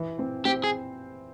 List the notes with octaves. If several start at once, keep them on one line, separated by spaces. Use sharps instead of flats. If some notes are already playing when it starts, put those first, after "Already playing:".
Already playing: E3 E4
C4 C5
C4 G4 C5
G#4